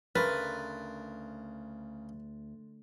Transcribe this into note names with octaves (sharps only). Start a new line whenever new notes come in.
D2 C#3 A#4 B4 C6 F#6 A6